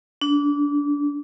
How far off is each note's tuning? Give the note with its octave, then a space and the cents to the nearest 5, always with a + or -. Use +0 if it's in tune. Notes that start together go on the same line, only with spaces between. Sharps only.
D4 -25